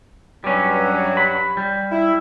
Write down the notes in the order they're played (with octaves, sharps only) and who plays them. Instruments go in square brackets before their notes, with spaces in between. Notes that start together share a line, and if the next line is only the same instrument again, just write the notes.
[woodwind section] G2 F#3 [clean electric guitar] G3 C#4
[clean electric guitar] B5
G3
[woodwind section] E4